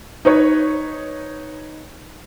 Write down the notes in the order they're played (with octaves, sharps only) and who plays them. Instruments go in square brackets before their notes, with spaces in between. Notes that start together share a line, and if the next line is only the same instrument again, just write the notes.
[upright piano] D#4 B4 C#5